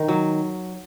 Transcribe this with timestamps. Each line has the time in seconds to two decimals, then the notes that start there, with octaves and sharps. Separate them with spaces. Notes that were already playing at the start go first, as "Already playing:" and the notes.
Already playing: D#3
0.08 F#3